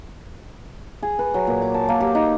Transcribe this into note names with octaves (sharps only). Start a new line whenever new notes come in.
G#4
B4
F#3
A#2
D6
A5
A#3
G4
D#4